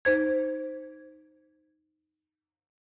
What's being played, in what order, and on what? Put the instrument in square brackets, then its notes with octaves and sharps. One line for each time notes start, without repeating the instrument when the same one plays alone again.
[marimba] D#4 C5 G#6